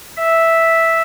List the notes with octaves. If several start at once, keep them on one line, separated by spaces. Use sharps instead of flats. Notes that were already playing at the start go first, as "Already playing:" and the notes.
E5